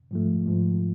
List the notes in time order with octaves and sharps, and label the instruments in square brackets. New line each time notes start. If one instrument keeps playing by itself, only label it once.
[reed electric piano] G#2 F3 A3
G#2 F3 A3